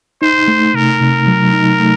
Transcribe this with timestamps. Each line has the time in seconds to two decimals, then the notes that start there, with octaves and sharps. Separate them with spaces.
0.22 D#4 C5
0.48 A3
0.74 C3 A#4
1.01 C3
1.27 F#3
1.53 D#4
1.79 A3